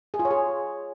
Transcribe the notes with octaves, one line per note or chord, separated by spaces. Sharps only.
G#4
F4
C#5
G#4